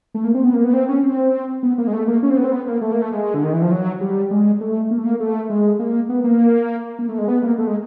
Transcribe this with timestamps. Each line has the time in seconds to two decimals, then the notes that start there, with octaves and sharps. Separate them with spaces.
0.14 A3
0.24 A#3
0.34 C4
0.44 B3
0.54 A#3
0.64 B3
0.73 C4
0.89 C#4
1.03 C4
1.63 B3
1.78 A#3
1.87 G#3
1.93 A3
2.08 A#3
2.23 C#4
2.30 C4
2.37 B3
2.44 C4
2.52 B3
2.67 A#3
2.81 A3
2.92 A#3
3.02 A3
3.12 G#3
3.34 D3
3.43 D#3
3.53 E3
3.62 F3
3.71 F#3
4.01 G3
4.31 G#3
4.61 A3
4.91 A#3
4.98 A3
5.06 A#3
5.20 A3
5.50 G#3
5.79 A#3
6.09 B3
6.24 A#3
6.99 A#3
7.09 A3
7.18 G#3
7.28 B3
7.43 A#3
7.58 A3
7.67 G#3